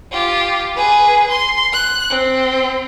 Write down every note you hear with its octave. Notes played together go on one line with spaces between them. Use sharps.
F4 G4
G#4 B4
C6
F#6
C4